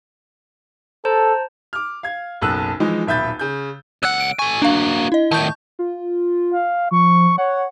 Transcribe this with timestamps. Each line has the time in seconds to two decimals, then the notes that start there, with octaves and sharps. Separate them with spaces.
1.05 A4 C5 A5 A#5
1.73 D6 F6
2.03 F5 G#6
2.41 F#1 B1 A4 E6 F#6
2.80 E3 F3 G#3 D#4
3.06 D#1 B1 E5 B5 G6 A6
3.39 C#3 G6
4.03 C#2 F#5 E6 F#6
4.20 D7
4.39 A4 G#5 C#6
4.62 A#3 D4 F#4 F5
5.12 E4 D#5
5.31 A2 D#3 A5 C#6 G6
5.79 F4
6.53 F5
6.91 F3 C#6
7.38 C#5 F#5